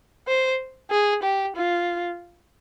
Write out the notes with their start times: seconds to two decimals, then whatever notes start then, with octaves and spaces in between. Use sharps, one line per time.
0.28 C5
0.91 G#4
1.23 G4
1.56 F4